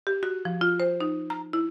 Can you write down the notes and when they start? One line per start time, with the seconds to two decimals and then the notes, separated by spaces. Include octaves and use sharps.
0.07 G4
0.23 F#4
0.45 F3
0.61 F4
0.80 C5
1.01 D#4
1.30 A#5
1.53 E4